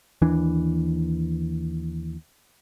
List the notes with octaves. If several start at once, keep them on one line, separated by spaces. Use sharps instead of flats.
D#2 E3 D4